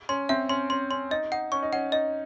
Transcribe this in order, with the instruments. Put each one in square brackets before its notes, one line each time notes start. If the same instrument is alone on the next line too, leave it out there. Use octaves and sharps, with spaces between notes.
[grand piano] C#4 [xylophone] C6
[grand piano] C4 [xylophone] E5
[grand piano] C#4 [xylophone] C6
[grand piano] C#4 [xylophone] C6
[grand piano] C#4 [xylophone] C6
[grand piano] D#4 [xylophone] D#5
[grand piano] D#4 [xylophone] F#5
[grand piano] C#4 [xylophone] C#6
[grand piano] D#4
[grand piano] C#4 [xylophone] F#5
[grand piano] D#4 [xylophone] D#5